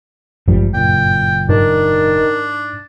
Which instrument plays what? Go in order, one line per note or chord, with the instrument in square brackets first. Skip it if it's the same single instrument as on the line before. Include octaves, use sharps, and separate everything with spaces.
[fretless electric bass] G#1 F3 G3 [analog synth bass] G2
[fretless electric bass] F#1 A#2 [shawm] G5
[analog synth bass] G#2 [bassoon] D#3 [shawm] D4